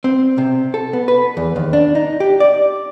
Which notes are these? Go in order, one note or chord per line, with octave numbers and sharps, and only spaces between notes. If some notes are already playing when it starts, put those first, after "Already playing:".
C4
C3
A4
B3
B4
E2
D#2
D4
D#4
G4
D5